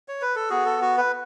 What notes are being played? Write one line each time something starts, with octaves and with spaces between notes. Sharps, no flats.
C#5
B4
A4
B3 F#4 G#4
A4
F#4
B4